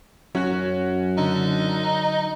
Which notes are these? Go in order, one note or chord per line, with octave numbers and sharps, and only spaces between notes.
F#2 F#3 C#4 F#4
D3 D#4